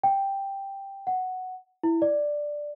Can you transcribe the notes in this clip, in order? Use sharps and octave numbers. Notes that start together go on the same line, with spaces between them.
G5
F#5
E4
D5